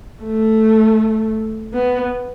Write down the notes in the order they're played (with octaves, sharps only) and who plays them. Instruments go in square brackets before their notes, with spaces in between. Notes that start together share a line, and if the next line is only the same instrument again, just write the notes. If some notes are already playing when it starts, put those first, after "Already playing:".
[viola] A3
B3